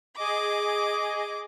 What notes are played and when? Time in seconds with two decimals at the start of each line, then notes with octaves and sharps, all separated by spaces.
0.17 G#4 D#5 D6